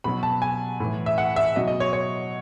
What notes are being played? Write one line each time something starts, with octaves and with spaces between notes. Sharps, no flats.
B2 F#3 B5
A5
G#5
A2 E3
E5
F#5
E5
B2 F#3 D#5
D#5
C#5
C#5